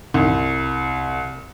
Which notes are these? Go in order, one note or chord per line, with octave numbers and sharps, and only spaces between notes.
C2